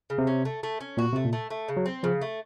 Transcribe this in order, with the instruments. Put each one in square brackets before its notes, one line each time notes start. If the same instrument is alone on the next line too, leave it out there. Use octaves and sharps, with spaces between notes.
[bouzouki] C#3
[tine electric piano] C3
[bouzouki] C#4
A3
A3
C#4
[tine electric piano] A#2 [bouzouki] F#4
[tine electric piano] C3 [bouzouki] A3
[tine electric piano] A#2
[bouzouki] A3
A3
C#3
[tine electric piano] F#3
[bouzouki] C4
[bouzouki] C#3 [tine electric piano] F3
[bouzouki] A3